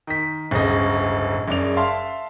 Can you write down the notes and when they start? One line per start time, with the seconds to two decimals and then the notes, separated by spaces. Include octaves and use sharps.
0.07 D#3 B6
0.51 D1 G1 C#3 D#5
1.48 F#1 C#3 D5 F7
1.77 E5 F5 A5 C6